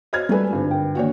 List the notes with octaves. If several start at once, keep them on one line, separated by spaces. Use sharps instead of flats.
F#4 C5 C#5 D#5 F6 G#6
G3 A3 B4 G#5
G#1 G2 D3 F4
A#4 B4 G5
D#3 A#3 D4 F#4 C#5